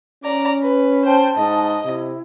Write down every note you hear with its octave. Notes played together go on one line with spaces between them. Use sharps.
C#4 D5 A#5
B4
C5 G5 A5
G#2 D#5
C3 E4